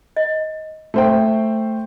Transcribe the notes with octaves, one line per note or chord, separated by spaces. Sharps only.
D#5
A3 C5 G5